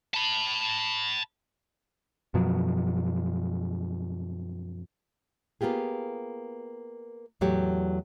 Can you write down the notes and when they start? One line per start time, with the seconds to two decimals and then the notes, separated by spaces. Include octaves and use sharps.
0.14 A5 B5
2.34 F#2 B2 F3 F#3
5.61 A#3 B3 F4 G4 G#4
7.41 E2 A2 F#3 A3 G4 C#5